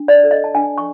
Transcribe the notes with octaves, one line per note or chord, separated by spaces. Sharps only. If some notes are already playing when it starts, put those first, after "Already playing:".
Already playing: D4
D5
A4
D#5
A5
D4 G#5
C#6